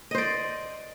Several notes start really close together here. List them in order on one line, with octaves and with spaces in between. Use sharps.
D#5 C5 D5